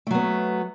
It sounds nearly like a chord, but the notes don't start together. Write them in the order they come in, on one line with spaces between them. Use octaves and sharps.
A3 F#3 B3